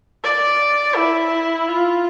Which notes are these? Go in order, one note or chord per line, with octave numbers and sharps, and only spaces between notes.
D5
E4
F4